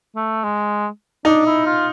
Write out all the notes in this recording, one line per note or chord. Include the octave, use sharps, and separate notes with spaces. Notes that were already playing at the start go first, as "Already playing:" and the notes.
A3
G#3
D4 D#4
E4
F4